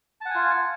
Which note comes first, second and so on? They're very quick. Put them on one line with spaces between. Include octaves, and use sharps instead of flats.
A5 F#5 G#5 F4